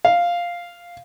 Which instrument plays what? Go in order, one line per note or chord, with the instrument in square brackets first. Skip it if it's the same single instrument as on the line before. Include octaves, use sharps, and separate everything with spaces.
[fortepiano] F5